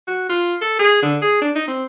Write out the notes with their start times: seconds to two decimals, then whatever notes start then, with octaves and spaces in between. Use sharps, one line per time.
0.08 F#4
0.29 F4
0.62 A4
0.79 G#4
1.02 D3
1.22 G#4
1.41 D4
1.55 D#4
1.68 C4